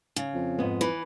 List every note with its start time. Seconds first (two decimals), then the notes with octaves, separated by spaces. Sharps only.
0.16 C#3
0.34 F2
0.59 G#2 B3
0.81 E3 B4